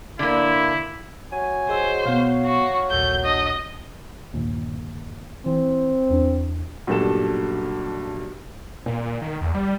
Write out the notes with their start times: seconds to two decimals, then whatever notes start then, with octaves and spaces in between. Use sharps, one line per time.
0.19 D3 A#3 E4
1.32 F#3 G#5
1.69 G#4 C5 D#5 E6
2.06 B2 B3 F5
2.45 F#4
2.90 A#1 D#2 A#2 A4 G6
3.24 D4 D#5
4.33 G1 D#2 A#2
5.46 E3 C4
6.10 E2 D4
6.87 B1 G2 A#2 A4 E7
8.86 A#2
9.04 A#2
9.22 D#3
9.41 E2
9.54 G3